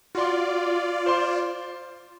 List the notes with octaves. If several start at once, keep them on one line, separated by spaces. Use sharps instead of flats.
F4 F#4 D5 C6
C5 C6